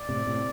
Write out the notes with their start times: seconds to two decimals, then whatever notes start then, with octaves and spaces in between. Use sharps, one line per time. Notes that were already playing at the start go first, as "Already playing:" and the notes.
Already playing: D5
0.09 A2 C3
0.27 A2 C3